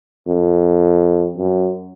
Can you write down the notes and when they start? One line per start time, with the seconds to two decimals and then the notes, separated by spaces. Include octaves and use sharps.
0.27 F2
1.38 F#2